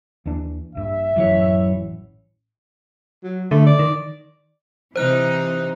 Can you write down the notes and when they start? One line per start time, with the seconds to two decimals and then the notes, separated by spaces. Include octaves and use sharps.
0.25 D#2 E3 D4
0.75 A#1 G2 E5
1.16 A1 F#2 E3 C#5
3.23 F#3
3.51 D3 A3
3.66 D5
3.79 D#3
4.96 C3 E3 D#4 C5 F#6